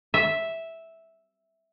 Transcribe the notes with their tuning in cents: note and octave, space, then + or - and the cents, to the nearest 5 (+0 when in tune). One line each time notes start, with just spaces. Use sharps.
E5 -5